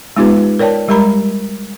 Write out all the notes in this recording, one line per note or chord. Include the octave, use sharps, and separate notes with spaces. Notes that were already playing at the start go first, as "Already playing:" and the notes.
G#3 B3 D#4 F4 G4 B4
A#4 C#5 D5 G5 A5
G3 G#3 G4 A#4 A#5 B5